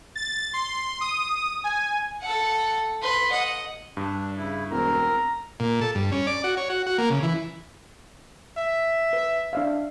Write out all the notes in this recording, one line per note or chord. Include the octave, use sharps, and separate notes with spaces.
A6
C6
D#6
G#5
A4 F#5
B4 C6
D#5 F#5
G2 D4
C#3 E4
E1 C4 A#4 A#5
A#2
A4
G2
C#4
D5
F#4
C#5
F#4
F#4
A#3
C#3
E3
E5
B4
D4 E5 F5